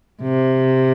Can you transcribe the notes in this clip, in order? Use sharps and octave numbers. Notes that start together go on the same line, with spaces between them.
C3